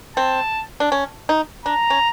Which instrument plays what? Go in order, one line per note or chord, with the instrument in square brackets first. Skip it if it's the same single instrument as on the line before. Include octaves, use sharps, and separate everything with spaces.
[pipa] C4 [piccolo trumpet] A5
[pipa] D4
C#4
D#4
[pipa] D4 [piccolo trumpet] A#5
[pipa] C#4